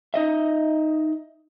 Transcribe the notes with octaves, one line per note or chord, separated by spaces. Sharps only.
D#4 D#5 E5